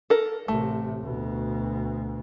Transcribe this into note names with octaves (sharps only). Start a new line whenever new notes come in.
A4 A#4
A1 C3 A3
D2 B2